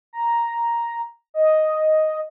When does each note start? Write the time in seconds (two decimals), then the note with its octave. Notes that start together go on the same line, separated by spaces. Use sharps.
0.13 A#5
1.34 D#5